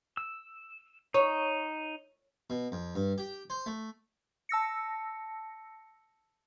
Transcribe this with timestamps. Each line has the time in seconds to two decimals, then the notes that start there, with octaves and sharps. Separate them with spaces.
0.17 E6
1.14 D#4 C#5
2.50 B2
2.72 F2
2.95 G2
3.18 G4
3.50 C5
3.66 A3
4.49 A5 E6 A#6 C#7